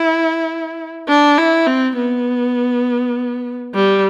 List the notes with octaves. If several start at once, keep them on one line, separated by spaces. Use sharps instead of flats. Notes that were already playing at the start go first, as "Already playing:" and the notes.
Already playing: E4
D4
E4
C4
B3
G3